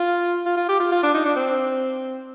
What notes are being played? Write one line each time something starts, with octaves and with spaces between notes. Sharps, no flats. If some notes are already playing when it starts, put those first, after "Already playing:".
Already playing: F4
F4
F4
G4
F4
F4
D4
D#4
D4
C4